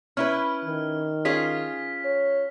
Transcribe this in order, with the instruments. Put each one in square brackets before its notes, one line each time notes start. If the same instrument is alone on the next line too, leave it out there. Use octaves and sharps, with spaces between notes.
[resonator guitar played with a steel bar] C#4 E4 B4 [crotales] F6
[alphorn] D#3
[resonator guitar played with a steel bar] C#4 F4 G#4 [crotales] B6
[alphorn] C#5